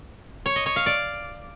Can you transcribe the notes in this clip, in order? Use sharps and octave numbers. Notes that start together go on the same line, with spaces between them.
C#5
D#5
C#5
F5
D5